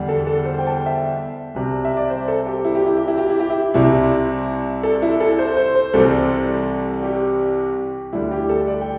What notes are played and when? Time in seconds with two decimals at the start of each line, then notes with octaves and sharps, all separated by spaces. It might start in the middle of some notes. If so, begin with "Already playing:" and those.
Already playing: E2 D3 G3
0.09 A4
0.27 A4
0.45 C5
0.58 G5
0.66 A5
0.72 G5
0.86 E5
1.54 C2 C3 G3
1.85 E5
1.97 D5
2.10 C5
2.28 A4
2.46 G4
2.64 E4
2.75 G4
2.86 E4
2.97 G4
3.07 E4
3.18 G4
3.29 E4
3.40 G4
3.50 E4
3.74 C2 C3 G3 E4
4.83 A4
5.02 E4
5.20 A4
5.39 C5
5.57 C5
5.75 C5
5.93 C2 C3 E3 G3 A4
7.03 G4
8.13 D2 D3 G3 E4
8.31 G4
8.49 A4
8.67 D5
8.81 G5